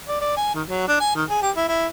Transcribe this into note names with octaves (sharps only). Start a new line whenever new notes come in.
D5
D5
G#5
D#3
F#3
D4
G#5
D#3
G#4
G4
E4
E4